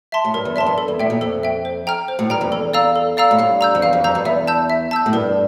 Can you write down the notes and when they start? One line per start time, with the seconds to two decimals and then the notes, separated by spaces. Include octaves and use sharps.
0.12 E5 A5 C6
0.25 A2
0.34 G2 A#4
0.45 E2
0.56 F2 E5 A5 C6
0.66 G2
0.78 A4
0.88 E2
0.99 A2 E5 G5
1.10 A#2
1.21 F2 A4
1.43 E5 G5
1.65 C5
1.87 G5 A#5 F6
2.08 C5
2.19 A2
2.30 G2 G5 A#5 F6
2.41 F2
2.52 E2 A4
2.73 D5 F5 A#5 E6
2.96 A4
3.17 D5 F5 A#5 E6
3.31 A2
3.39 G2 F5
3.61 A#5 E6 G6
3.75 F2
3.82 E2 F5
3.93 F2
4.04 F2 A#5 E6 G6
4.15 G2
4.25 E2 E5
4.47 A5 E6 G6
4.70 E5
4.91 A5 E6 G6
5.06 A2
5.13 G2 A#4